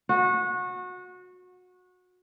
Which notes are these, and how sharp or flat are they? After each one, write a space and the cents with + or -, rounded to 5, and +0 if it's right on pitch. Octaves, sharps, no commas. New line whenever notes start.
F#4 -25